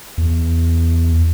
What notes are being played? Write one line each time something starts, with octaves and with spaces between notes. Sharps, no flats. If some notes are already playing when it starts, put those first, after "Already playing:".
E2